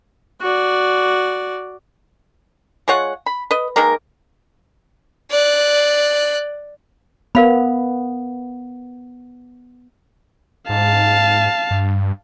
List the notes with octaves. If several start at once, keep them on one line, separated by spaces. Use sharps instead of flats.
F#4 D5
G#3 F4 C#5 F#5
B5
B4 D#5
D#3 G#3 A#3 A#4
D5 F#6
B3 A#4 F5 B5
G#2 F5 A5
G2